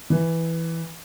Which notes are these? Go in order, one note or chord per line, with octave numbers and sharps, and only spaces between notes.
E3